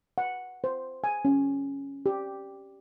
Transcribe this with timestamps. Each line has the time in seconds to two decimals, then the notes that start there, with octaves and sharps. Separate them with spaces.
0.18 F#5
0.64 C5
1.04 G#5
1.25 C#4
2.06 G4